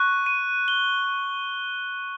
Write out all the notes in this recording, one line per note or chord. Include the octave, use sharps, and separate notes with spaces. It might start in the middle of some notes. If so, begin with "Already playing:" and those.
Already playing: C#6 F#6
D#7
G7